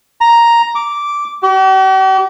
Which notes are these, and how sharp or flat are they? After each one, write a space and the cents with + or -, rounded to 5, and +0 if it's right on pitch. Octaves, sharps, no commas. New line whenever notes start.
A#5 +5
D6 -10
G4 -45